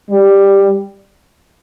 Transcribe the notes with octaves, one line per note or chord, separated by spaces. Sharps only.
G3